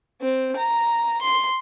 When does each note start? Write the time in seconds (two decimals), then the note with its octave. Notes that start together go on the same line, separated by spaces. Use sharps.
0.21 C4
0.57 A#5
1.22 C6